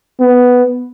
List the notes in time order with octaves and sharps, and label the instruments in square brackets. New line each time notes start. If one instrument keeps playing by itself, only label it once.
[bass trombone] B3